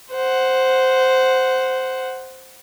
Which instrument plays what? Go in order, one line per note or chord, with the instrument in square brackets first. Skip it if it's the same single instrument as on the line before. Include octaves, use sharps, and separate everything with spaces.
[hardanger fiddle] C5 F#5